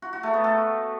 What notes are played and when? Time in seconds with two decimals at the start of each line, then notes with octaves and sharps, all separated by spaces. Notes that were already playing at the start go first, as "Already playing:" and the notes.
0.02 F#4
0.13 F#4
0.23 A3
0.34 B3
0.44 A4